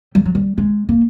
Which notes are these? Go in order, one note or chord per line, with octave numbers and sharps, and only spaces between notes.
G3
F#3
G3
G#3
A#3